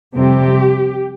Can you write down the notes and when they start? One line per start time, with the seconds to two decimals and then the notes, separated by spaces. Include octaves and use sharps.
0.16 F2 C3 G3 C4 G4